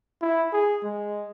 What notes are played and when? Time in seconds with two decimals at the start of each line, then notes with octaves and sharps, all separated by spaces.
0.22 E4
0.53 G#4
0.84 G#3